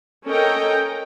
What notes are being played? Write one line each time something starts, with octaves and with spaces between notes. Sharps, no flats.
C#4 A4 A#4 D#5 G5